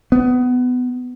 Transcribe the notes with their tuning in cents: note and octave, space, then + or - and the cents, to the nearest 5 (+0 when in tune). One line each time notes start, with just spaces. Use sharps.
B3 +20